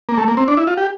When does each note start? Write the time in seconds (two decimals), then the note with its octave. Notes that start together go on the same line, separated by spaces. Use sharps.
0.09 A#3
0.18 A3
0.28 A#3
0.37 C4
0.48 D4
0.57 E4
0.67 F4
0.77 G4